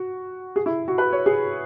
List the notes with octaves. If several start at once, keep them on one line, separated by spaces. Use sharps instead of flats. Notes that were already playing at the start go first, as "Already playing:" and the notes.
Already playing: F#4
G#4
E4
F#4
B4
C#5
G#4